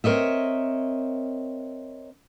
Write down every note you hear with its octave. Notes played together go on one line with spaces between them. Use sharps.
C4 A#4 C#5 D#5 E5